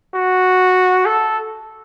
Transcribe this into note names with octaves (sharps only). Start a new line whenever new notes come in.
F#4
A4